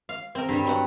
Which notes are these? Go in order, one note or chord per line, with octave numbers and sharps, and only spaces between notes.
F5
C4 A#4
G2 G3
F#3 C4 F#5